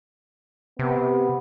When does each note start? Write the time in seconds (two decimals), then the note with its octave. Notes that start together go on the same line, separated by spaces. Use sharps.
0.79 C3 B3